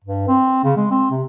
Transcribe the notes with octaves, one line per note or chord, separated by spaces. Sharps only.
G2
C4
C#3
G#3
C4
C3